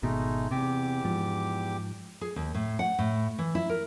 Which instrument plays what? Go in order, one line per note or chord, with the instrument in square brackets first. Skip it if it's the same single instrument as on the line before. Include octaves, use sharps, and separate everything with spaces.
[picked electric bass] G#1 B2 [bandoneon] G#3 A3 D#4
[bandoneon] E2 G4 D6 [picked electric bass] C3
[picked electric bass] G#2 F3
[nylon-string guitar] G#4
D#2
A2
F#5
A2
E3
E4
A#4